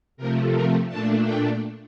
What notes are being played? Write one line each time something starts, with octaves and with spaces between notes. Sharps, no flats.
C3 F3 A3 A#4
A#4
A#2 A3 D4 A5
G5